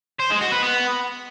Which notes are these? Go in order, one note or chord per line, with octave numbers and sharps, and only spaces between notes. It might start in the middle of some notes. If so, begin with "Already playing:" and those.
C5
G#3
F#4
B4
B3